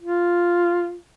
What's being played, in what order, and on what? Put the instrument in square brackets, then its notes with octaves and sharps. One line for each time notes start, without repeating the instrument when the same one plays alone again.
[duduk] F4